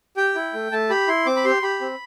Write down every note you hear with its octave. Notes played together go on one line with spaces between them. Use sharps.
G4 G5
E4
A3
A3 A5
G4 B5
E4 C6
C4 D6
B5
G4 C6
G4 B5
C4